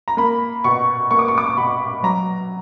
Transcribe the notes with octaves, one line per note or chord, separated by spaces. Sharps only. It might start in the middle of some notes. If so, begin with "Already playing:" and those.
A#5
A#3 B5
B2 C#6
A#3 C#6
D6
C#6
D6
C#6
B2 B5
F#3 A#5